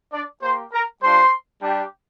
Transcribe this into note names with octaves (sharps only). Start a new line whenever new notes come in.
D4 D5
A#3 G4 C5 C6
A#4 A#5
G3 D4 F4 C5 C6
G3 D4 G4